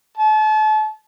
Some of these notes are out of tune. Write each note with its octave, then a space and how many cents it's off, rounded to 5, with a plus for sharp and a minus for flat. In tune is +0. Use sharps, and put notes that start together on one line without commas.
A5 -35